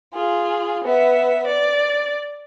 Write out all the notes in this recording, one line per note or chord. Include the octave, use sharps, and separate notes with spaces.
F4 G#4
B3 E5
D5